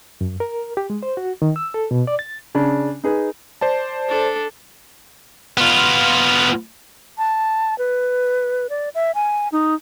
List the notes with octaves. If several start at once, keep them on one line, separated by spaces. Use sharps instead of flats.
F#2
A#4
G4
G#3
C5
F#4
D#3
E6
A4
B2
D5
A6
C#3 D4
D#4 G#4 B4
C5 D5 A5
D4 A4
B3 F4
A5
B4
D5
E5
G#5
D#4